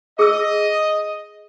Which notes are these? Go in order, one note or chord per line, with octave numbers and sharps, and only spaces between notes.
G#4 D#5 E6